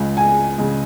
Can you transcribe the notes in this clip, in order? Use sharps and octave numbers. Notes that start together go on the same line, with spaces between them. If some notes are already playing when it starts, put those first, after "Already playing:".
Already playing: C#2 C#3 G#3
G#5
C#3 G#3